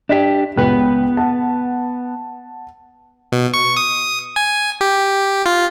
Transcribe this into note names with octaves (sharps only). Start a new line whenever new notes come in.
D4 G4 D5 B6
C#2 B3 B4 G5 F#6
F#5 A5
B2
C#6
D#6
G#5
G4
F4